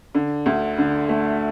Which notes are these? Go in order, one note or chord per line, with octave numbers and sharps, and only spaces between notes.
D3
D2
D3
A3